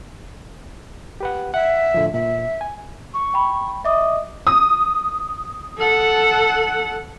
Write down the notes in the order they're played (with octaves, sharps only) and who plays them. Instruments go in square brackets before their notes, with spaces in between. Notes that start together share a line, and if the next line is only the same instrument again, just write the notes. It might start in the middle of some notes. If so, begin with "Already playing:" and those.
[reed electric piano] G4 B4 F#5
[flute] E5 [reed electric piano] F#5
[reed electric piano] A2 D3 F3
[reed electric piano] A#2 [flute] E5
[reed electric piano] G#5
[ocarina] C#6
[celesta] G5 B5
[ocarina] D#5 [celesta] E5 D6 D#6
[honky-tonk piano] D#6
[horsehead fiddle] A4 F#5